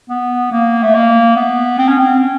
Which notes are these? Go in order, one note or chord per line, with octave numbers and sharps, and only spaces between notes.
B3
A#3
A3
A#3
B3
C4
C#4
C4
C#4